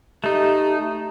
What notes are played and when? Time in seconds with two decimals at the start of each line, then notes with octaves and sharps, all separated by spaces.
0.24 A3 D#4 G4